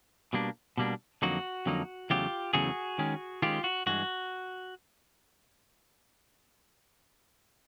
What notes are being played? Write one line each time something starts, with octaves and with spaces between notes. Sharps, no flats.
B2 G3 A#3 D4
B2 G3 A#3 D4
F2 D3 F#3 A#3 D#4 F#4
F2 D3 F#3 A#3 D#4
E2 C#3 F#3 A3 F4 G4
E2 C#3 F#3 A3 F#4 G#4
D#3 G#3 C#4
D#3 G#3 C#4 F4 G4
F#4
G2 E3 G#3 F#4